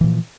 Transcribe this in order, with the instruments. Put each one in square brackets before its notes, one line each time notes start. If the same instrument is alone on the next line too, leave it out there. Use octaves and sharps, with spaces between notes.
[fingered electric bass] E3
A#2
F3